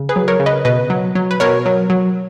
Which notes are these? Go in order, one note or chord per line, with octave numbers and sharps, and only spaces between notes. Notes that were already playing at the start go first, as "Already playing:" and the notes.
Already playing: C#3
G#4 B4
F#3
A#4 C#5
C#3
B4 D#5
B2 B4 D#5
F#3
F#3
B4
B2 A#4 C#5
F#3
F#3